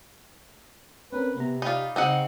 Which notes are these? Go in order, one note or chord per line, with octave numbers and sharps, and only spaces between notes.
C4 C#4 A#4 B4
C3 B3 B4 A#5
D#4 F4 D5 G5 B5
C#3 C4 D#4 F#5